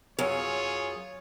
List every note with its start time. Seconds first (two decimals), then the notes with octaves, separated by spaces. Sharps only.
0.19 F#2 F4 G#4 C#5